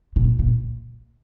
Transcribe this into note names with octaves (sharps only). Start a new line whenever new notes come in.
A#2
A#2